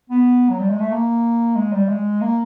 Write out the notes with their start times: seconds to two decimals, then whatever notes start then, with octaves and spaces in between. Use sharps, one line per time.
0.10 B3
0.50 F#3
0.60 G3
0.70 G#3
0.81 A3
0.91 A#3
1.56 G#3
1.73 G3
1.89 G#3
2.21 A#3